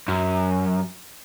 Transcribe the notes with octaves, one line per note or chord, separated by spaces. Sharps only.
F#2